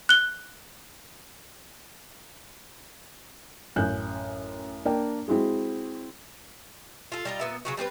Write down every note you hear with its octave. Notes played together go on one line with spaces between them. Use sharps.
F#6 G7
A1 F#2 G#5 F#6 G6
A#3 D4 G5
G#3 C4 E4 F#4 G#4
F4 A4
G3 D#4 F4
A#2 B3 E5
C#3 F#3 F#4
G3 C4 G4 B4